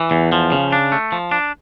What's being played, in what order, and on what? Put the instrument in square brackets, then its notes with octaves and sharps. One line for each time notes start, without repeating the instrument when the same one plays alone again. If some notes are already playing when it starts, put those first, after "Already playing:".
Already playing: [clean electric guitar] E3
E2
F3
C#3
D4
A3
F3
D4